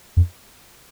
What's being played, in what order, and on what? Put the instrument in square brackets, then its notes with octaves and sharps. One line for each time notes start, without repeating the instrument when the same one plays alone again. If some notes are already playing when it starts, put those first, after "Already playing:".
[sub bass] F2